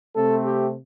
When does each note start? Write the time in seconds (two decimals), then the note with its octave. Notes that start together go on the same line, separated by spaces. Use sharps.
0.15 C3 A3 C4 A4
0.45 G4